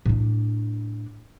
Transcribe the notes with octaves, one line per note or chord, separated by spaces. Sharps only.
A2 D4